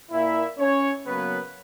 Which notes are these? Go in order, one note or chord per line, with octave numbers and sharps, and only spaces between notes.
A#2 A#3 E4 E5
C#4 C#5
C#3 F#3 A#3 B3 B4